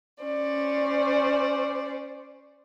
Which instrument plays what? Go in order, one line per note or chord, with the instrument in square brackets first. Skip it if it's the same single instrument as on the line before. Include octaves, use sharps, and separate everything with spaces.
[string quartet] C#4 C5 D5